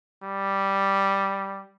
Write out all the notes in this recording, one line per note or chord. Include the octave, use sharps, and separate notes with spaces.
G3